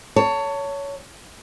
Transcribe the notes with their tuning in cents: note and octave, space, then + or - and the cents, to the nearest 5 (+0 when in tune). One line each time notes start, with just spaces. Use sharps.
C#5 +20 A5 +25